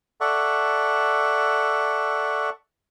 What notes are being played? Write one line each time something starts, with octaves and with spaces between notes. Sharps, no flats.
A4 D5 E5 F#5 C#6